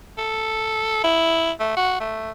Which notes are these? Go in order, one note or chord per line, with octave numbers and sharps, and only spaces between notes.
A4
E4
A3
F#4
A3